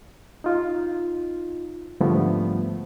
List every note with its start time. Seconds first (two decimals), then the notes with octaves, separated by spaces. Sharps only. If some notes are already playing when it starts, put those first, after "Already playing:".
0.44 D#4 F4
2.00 G#2 D3 F3 G3 A3 B3